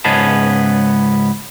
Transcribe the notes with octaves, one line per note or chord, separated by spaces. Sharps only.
C#2 G#2 B3 C#4 G#4 A5